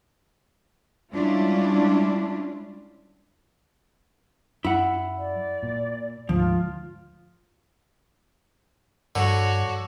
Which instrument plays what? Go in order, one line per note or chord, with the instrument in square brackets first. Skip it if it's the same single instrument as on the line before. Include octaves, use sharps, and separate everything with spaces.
[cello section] G3 G#3 C#4 D4 E4 F4
[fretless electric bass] F#2 [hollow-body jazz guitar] E4 F#5
[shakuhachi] D5
[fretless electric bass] A#2
[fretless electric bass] D2 G#2 [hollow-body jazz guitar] F3 [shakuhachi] F4
[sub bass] G2 [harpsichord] D3 [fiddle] F#4 C#5